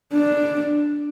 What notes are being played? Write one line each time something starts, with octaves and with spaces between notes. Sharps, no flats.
D4